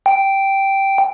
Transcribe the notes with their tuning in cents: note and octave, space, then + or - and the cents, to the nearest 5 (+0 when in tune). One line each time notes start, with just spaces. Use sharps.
G5 -5